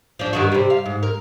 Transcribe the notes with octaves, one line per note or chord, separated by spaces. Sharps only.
F3 D4
G2 D#3 F#4
C3 G3
F5
G#2
A#4